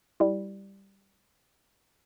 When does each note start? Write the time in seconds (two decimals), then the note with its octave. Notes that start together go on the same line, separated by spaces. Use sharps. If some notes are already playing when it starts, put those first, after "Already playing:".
0.20 G3 E4